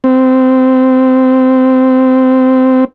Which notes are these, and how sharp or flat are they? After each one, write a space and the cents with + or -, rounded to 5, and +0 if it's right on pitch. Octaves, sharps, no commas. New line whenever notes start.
C4 -15